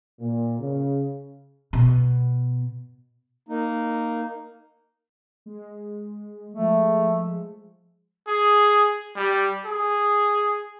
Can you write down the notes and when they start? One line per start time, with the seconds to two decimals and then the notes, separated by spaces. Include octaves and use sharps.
0.20 A#2
0.59 C#3
1.73 B2
3.49 A#3 D#4
5.46 G#3
6.54 F3 G#3 A3
8.28 G#4
9.16 G3
9.65 G#4